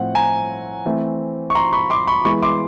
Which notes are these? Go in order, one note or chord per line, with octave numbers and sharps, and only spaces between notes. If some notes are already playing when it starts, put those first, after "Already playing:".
Already playing: A2 F3 A3 C4 F#5
G#5 A#5
E3 A3 C4
C#6
A#5 C6
B5 C#6
C6 D6
B5 C#6
E3 G#3 B3 B5 C#6
C6 D6